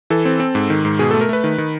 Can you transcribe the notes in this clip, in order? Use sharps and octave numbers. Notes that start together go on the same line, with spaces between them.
E3 A4
C4
C4
G#2
D#3
G#2
B2 G#4
A4
A3
A#4
A3 B4
D#3
D#3